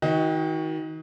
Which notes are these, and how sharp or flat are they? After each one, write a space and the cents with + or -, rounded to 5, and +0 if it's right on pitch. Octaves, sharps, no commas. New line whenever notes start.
D#3 +35 F#4 +0 D#5 +25